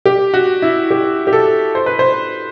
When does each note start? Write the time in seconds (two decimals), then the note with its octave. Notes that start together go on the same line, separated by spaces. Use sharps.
0.06 G4
0.34 F#4
0.62 E4
0.91 G4
1.27 G4
1.33 A4
1.75 C5
1.86 B4
1.99 C5